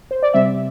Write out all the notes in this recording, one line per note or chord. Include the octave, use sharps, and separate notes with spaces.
C5
D5
C3 G3 C4 E5